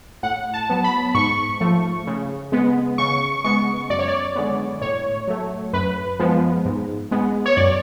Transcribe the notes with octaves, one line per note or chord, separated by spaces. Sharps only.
A2 F#5
A5
F#3 B3
B5
G#2 C#6
F3 A3
C#3
G#3 B3
C#3 C#6
G#3 B3 C#6
F#2 D5
C#5
D5
D3 G#3 B3
A2 C#5
F#3 A3
F#2 B4
F3 G#3 B3
G#2
G#3 B3
C#5
F#2 D5